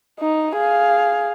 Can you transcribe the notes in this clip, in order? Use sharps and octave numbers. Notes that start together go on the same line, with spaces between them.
D#4
G#4 F5